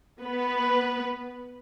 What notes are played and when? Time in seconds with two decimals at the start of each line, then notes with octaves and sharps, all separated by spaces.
0.22 B3 B4